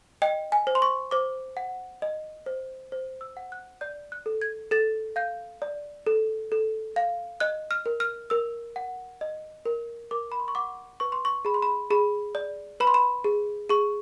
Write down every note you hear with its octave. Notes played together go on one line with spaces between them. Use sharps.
D#5 G5
G#5
C5
C6
C#6
C5 D6
F#5
D#5
C5
C5
E6
F#5
F#6
D5 G6
F#6
A4
G#6
A4 A6
F5 G6
D5
A4
A4
F5
D#5 F#6
F6
A#4
F6
A#4 E6
F#5
D#5
A#4
A#4 D6
B5
C6
C#6
F#5 D6
B4 C#6
C6
C#6
G#4 B5
C6
B5
G#4 B5
D5
B4 B5
C6
B5
G#4
G#4 C#6